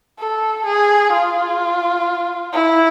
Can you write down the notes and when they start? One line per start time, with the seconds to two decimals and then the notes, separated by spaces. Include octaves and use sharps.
0.19 A4
0.66 G#4
1.12 F4
2.53 E4